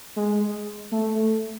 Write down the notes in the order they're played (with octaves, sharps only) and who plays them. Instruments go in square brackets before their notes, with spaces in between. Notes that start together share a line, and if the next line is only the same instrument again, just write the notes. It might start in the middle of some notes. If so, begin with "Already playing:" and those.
[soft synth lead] G#3
A3